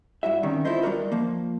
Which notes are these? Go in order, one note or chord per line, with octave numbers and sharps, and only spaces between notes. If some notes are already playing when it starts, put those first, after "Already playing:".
G2 E4 F#4 E5
C3 D#3 G3 C#4
E4 F4 A4 C5 D#5
G3 D4 D#4 F#4 A#4 D#5
F3 A#3